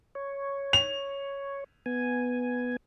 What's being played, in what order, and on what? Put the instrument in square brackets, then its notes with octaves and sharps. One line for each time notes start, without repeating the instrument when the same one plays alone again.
[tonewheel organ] C#5
[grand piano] F7
[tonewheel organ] B3 G#5